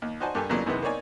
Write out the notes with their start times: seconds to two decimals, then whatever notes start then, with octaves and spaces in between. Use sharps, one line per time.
0.02 D#2
0.20 D#4 F#4 C5 D5 G#5 A5
0.35 G2 A#3 G4 A4 G#5
0.49 F2 C#3 E3 F#3 G3 A#3
0.66 F#2 C3 D#3 E3 G#3 B3
0.82 A#3 C4 D#4 C#5 D5 G#5